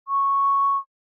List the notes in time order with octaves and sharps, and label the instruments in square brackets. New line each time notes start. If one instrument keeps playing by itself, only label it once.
[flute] C#6